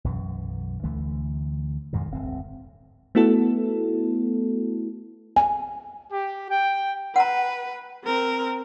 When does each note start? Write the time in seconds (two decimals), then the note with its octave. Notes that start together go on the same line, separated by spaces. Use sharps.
0.04 B1 F#2 E3
0.83 D2 D3 E3 A3
1.93 F2 G#2 B2 D#3
2.11 D1 G1 C4
3.15 A3 B3 E4 F#4 A4
5.36 G#5
6.13 G4
6.51 G5
7.16 B4 F#5 A#5
8.05 C4 A#4